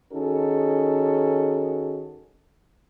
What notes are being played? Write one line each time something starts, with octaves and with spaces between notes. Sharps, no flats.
D#3 C#4 D#4 F#4 G#4 A4